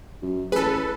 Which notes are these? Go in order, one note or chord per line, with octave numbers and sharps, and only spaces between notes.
F#2
A1 G#4 A4 B4